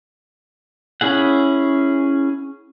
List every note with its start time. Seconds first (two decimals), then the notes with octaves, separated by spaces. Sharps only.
1.01 C#4 E4 G#4 F#5